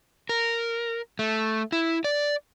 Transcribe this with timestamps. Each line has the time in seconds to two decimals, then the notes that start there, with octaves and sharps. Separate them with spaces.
0.29 A#4
1.19 A3
1.72 E4
2.04 D5